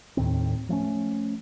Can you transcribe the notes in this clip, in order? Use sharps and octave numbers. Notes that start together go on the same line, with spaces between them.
D#2 A2 D#3 C4
F3 A3 A#3 C#4